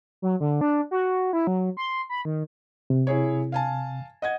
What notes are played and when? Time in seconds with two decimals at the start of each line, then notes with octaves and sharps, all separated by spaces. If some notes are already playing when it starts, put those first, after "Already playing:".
0.22 F#3
0.40 D3
0.61 D4
0.91 F#4
1.33 E4
1.47 F#3
1.77 C6
2.09 B5
2.25 D#3
2.90 C3
3.07 E4 G#4 C#5
3.52 F5 G#5 A5
4.22 D#5 F#5 G#6